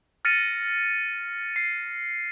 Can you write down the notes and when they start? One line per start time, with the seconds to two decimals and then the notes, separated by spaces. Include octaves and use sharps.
0.25 F6 A6 A#6 C#7 D#7
1.56 C7